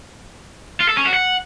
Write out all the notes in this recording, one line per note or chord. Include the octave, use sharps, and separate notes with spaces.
F4
A4
C#4
F#4
F#5